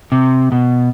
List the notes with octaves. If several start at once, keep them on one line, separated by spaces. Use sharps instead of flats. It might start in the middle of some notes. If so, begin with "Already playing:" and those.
C3
B2